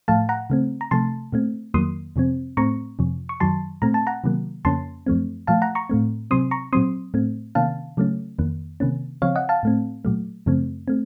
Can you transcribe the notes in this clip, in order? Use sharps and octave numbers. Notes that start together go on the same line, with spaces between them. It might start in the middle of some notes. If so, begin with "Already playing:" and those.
A2 F3 A3 F5 A5
F#5 A#5
C#3 A3 C4
A#5
C3 F3 A3 A5 C6
A#2 A3 C4
F2 D#3 F#3 A#3 C6 D#6
F2 C3 F3 C4
A2 A3 C4 A#5 C#6
F2 C3 F3
C#6
F#2 D#3 F#3 A5 C6
A#2 A3 C4 A#5
A5
F#5 A#5
C3 D#3 F#3 A#3
F2 C#3 F3 A#3 C#4 A5 C6
F#2 F3 A3 C4
A#2 F3 A3 F5 A5
F#5 A#5
A#5 C#6
A2 A3 C4
C3 F#3 C4 C6 D#6
A#5 C#6
A#2 F#3 C4 C6 D#6
A2 A3 C4
C3 D#3 A#3 C#4 F5 A5
C#3 F#3 A3 C#4
F2 D#3 A#3
C3 D#3 A#3 C#4
C#3 F3 C4 C#5 F5
D#5 F#5
F5 A5
A2 A3 C4
A#2 F#3 A3
F#2 C#3 F3 A3 C4
A3 C4